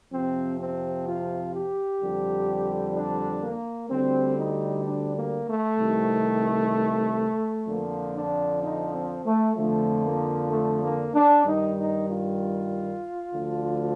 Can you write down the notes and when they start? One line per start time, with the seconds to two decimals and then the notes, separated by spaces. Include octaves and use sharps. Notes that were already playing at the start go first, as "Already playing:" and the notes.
0.13 F2 C3 F3 C4
0.60 C4
1.08 F4
1.55 G4
2.01 F2 D3 G3
2.95 D4
3.43 A#3
3.90 D2 D3 G3 C4
4.38 D#4
4.84 D4
5.17 A#3
5.47 A3
5.79 C2 C3 D#3
7.68 F2 D3 F3 A#3
8.16 D4
8.63 D#4
8.94 C4
9.26 A3
9.57 F2 D3 F3 A3
10.04 A#3
10.51 A3
10.84 A#3
11.15 D4
11.46 G2 D#3 G3 D#4
11.78 D#4
12.09 F4
13.35 D2 D3 F3